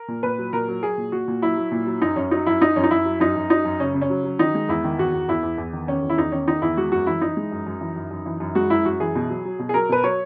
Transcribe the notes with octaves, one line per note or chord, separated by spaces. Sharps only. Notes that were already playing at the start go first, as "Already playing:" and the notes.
Already playing: A#4
A#2
A#2 B4
F#3
A#2 A#4
F#3
F#3 G#4
A#2
A#2 F#4
A#2
F#3 E4
F#3
A#2
F#3
F#2 D#4
F#2 C#4
F#3 D#4
F#2 E4
F#2 D#4
F#2 C#4
D#4
F#2 E4
F#3
F#2 D#4
F#2
F#3 D#4
F#2
C#3 C#4
C#3
C#4
F#3
F#3
D#3 D#4
G#3
E2 E4
D#3
E2 F#4
E2
E2 E4
E2
E2
D#3
D#3 C#4
E2
E4
E2 D#4
D#3 C#4
D#3 D#4
E2 E4
G#3 F#4
F#2 F#4
E3 E4
E3 D#4
G#3
F#2
F#2
E3
F#2
F#2
E3
F#2
G#3 F#4
F#2 E4
F#2 F#4
E3 G#4
B2
F#3
F#3
B2
G#4
F#3 A#4
B2 B4
F#3 C#5